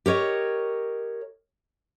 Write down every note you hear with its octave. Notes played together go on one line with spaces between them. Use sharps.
G4 A#4 C#5 D#5